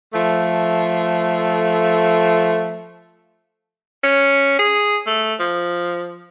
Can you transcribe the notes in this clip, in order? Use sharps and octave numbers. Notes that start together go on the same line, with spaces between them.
F3 A3
C#4
G#4
A3
F3